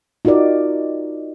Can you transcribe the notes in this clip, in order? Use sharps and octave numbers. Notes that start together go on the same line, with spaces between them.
D#4 F4 F#4 A#4 D5